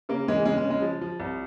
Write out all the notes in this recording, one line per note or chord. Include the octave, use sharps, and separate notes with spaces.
C#3 A#3
E3 G#3
C#3 G#3
G#3
C#3
G#3
F3
F3
C2